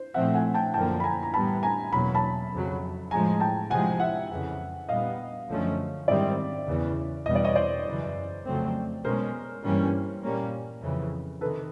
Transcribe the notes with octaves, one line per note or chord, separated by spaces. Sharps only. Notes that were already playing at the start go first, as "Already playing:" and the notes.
Already playing: C5
A#2 F3 A3 C4 E5 F#5
F#5 G#5
G5 A5
F#2 D3 F3 A#3 G5 A5
B5
G#5 A#5
A#5
A2 E3 G3 B3 A5 B5
G#5 A#5
E2 B2 F#3 A#3 B5
A5 B5
F2 C#3 F#3
A2 F3 G#3 G#5 A#5
G5 A5
C3 F3 G#3 F#5 G#5
E5 F#5
F2 C#3 E3
A#2 G3 B3 D#5 F5
F#2 D3 F3 A3 C#4
G#2 D#3 G3 C4 D5 E5
E2 C#3 E3
E2 B2 G3 B3 D#5
D5
C#5 D#5
C5 D5
F#2 C#3 E3
F2 C#3 F#3 A3 C4
B2 G#3 C#4 A#4 C5
G2 E3 G3 A#3 C#4
A#2 G3 A#3 C#4
F2 C#3 E3
C3 D#3 A4 B4